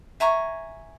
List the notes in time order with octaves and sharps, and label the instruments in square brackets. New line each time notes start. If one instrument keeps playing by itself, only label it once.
[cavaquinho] E5 G#5 A#5 C#6